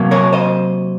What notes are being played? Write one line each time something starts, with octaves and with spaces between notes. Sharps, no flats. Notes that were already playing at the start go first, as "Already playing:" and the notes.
Already playing: C3 F#3 A#3
A#4 C#5
C5 D#5